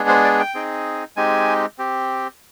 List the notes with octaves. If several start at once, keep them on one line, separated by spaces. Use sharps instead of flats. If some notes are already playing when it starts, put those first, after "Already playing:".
Already playing: G#3 B3 D4 G#4
C5
D5
G5
C4 D#4 G#4
G#3 C4 D#4 G4 G#5
C4 G4